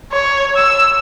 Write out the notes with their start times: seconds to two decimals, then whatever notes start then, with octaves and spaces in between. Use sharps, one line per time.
0.13 C#5
0.56 E6